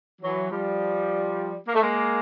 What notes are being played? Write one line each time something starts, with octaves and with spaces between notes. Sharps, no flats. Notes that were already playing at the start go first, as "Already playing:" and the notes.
E3 F#3
F3 G3
A#3
A3
G#3 A#3